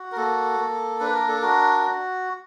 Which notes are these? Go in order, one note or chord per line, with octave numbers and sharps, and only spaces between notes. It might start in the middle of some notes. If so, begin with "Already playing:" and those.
Already playing: F#4
A#4
A#3 A4
A#3
D4 B4
A#4
A4
F#4 A#4